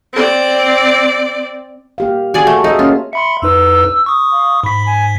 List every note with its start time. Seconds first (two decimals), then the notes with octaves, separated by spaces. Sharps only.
0.13 C4 D5
1.98 A#3 G4 F5
2.34 F#4 G#4 D5 G#5
2.47 A3
2.64 D#4 G#4 D#5 E5
2.79 A#3 C#4 F4
3.13 E5 B5 C6 C#7
3.42 F2 D#4 B4 E6
4.06 C#6 D#6
4.32 F5
4.64 G#2 B5 B6
4.86 G#5